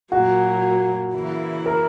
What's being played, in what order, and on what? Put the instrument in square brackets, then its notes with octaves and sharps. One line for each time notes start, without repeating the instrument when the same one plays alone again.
[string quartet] A#2 F#3 A#3 [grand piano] F#4
[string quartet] C#3 E3 A#3 E4
[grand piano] A#4